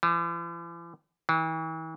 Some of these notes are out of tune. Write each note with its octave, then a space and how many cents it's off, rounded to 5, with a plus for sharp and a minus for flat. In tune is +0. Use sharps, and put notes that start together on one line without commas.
E3 +45
E3 -40